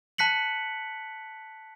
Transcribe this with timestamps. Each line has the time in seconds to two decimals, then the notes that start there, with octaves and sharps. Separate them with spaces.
0.18 A5 F#6 B6 C#7 F#7